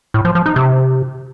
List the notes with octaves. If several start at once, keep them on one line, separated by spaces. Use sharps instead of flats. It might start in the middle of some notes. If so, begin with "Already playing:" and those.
A2
F3
F3
D#4
C3